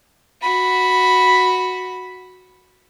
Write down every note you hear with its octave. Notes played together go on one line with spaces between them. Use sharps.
F#4 B5